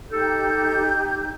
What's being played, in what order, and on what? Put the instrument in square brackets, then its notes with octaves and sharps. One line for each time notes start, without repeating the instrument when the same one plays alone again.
[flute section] D#4 G4 G6 [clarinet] A4